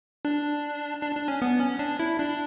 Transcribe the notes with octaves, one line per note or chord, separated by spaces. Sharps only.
D4
D4
D4
C#4
B3
C#4
D4
E4
D4